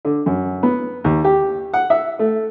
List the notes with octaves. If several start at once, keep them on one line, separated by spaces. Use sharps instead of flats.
D3
F#2
B3
D#2
G4
F#5
E5
A3